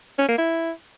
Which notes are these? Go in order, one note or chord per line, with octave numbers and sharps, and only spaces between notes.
C#4
A#3
E4